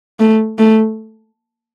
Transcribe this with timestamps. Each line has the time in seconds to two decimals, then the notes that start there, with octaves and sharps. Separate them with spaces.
0.20 A3
0.59 A3